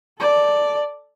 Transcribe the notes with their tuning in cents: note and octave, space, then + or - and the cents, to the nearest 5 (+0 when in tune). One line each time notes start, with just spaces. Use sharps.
A4 +0 D5 +0